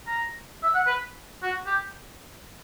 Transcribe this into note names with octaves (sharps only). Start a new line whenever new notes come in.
A#5
E5
F#5
B4
F#4
G4